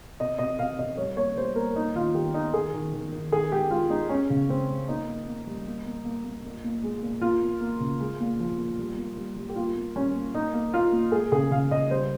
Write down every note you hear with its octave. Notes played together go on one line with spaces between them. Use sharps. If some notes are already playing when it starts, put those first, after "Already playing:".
C3 D#5
C3 D#5
C3 F5
C3 D#5
G3 C#5
A#3 C#5
G3 C5
A#2 A#4
A#3 D#4
D#3 F4
D#3 G4
D#3 D#4
D#3 G#4
D#3
D#3
D#3
D#3 G#4
G#3 G4
G#3 F4
G#3 D#4
G#3 C#4
C#3
G#3 C4
G#3
A#3 D#4
A#3
A#3
G3
A#3
A#3
A#3
A#3
A#2
A#2
G#3
A#2
A#3 F4
A#3
A#3
C#3
G#3
A#2
F3
A#2
G3
A#3
G3
G3
G4
A#3 F4
A#3
G3 C#4
A#3
A#3 D#4
A#3
A#2 F4
A#2
G#3 G#4
C#3 G#4
C#3 F5
C#3 D#5
G3 C5